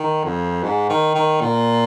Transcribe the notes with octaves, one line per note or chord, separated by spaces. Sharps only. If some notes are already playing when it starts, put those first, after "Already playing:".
Already playing: D#3
F2
G#2
D#3
D#3
A#2